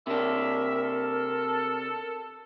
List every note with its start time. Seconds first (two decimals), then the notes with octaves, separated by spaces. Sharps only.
0.07 C3 D4 A#4 E5
0.83 A4